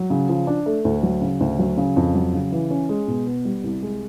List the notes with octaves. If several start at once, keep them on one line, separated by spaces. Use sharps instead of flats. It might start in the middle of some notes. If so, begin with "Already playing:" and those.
Already playing: F#3
C#3
F3
D4
A3
D2
F#3
C#3
D2
F#3
C#3
F2
F#3
C#3
E3
C#4
G#3
B2
B3
G3
C2
G#3